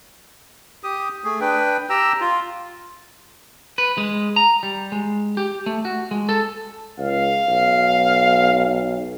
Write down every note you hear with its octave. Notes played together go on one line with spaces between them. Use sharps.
G4 D#6
A3 G#4
D4 B4 G5
G4 G5 A#5 E6
F4
B4
G#3
A#5
G3
G#3
G4
A3
F#4
G#3
A4
C#2 F5
B1